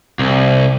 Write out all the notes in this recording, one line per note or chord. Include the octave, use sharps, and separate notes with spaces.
C2